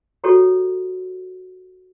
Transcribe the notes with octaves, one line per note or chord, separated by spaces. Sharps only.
E4 F#4 G4 A4 C#5